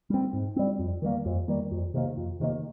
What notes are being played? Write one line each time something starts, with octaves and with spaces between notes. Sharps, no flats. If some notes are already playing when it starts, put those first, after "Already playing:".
G3 C4
G#2
G3 C4
F2
D#3 G3 A#3
F2
D#3 G3 A#3
F2
C3 D#3 A#3
F2
C3 D#3 A#3